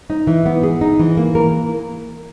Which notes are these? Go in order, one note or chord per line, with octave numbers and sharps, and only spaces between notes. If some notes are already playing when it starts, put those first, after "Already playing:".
D#4
E3
B3
G#4
D#4
E3
A#3
A#4